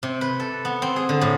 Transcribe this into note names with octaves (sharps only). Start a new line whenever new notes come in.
C3
B4
A4
B3
C4
G#4
D3
A2